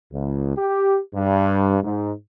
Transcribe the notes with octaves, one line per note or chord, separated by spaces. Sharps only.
C#2
G4
G2
G#2